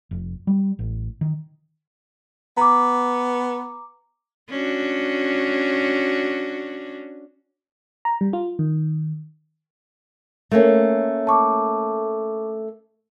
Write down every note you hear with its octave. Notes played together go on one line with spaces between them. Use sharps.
F1
G3
A1
D#3
B3 A#5 D6
C#4 D4 F#4
A#5
G3
F4
D#3
A3 A#3 C#4
A5 C#6 D6